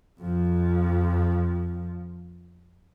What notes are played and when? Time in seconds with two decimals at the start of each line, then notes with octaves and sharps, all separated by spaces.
0.19 F2 F3